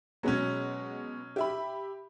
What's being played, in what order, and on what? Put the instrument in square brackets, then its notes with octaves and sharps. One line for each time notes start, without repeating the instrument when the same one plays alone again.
[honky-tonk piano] B2 G#3 B3 [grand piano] F#3 C#4
[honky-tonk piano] G4 E5 B5